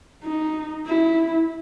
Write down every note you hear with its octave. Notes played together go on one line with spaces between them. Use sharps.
D#4
E4